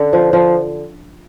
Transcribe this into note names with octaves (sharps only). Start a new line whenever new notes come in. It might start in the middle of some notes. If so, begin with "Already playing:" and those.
Already playing: D3
F3
F3